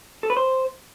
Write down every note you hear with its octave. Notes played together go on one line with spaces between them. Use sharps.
A4
B4
C5